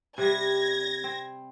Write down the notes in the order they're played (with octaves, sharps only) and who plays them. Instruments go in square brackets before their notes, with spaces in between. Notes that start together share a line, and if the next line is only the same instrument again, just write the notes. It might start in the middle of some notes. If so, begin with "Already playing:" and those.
[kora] C3 G3 [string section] G#6 A#6
[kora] C4